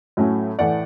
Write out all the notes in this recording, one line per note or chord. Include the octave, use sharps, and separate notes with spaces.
A2 F#3 A3 C#4
A2 E3 A3 D5 F#5